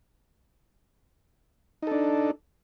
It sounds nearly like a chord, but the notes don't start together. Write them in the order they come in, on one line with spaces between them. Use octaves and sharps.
D#4 A4 D4